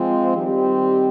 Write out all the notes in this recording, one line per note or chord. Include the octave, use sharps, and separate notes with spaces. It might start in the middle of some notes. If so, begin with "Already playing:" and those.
Already playing: F3 G#3 C4 F4
D#3 G3 C4 G4